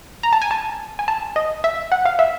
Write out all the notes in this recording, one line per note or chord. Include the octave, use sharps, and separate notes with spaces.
A#5
A5
G#5
A5
G#5
A5
D#5
E5
F#5
F5
E5